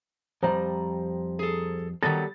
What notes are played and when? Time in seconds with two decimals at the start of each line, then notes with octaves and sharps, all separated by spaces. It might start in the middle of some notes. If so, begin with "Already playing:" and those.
0.43 F2 G3 C5 A#5
1.39 G#4 A4
2.03 D#3 F#3 G3 B3 A4 A6